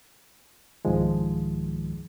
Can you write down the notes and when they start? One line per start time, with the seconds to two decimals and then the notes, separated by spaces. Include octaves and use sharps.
0.85 C2 G#2 D#3 F3 G#3